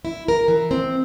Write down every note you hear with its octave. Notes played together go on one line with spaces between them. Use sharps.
E4
A#4
E3
C4